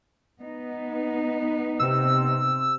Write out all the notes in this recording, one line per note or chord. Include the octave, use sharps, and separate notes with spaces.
B3 D#4
C3 E6